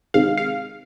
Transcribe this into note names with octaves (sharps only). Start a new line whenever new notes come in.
C3 D#3 G#3 F5
F5